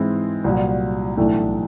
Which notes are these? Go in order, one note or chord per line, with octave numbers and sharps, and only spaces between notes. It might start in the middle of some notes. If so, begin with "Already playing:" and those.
Already playing: G#2 E3 G#3 C4 E4
C2 A#2 F#3
B1 A2 E3 A3 D4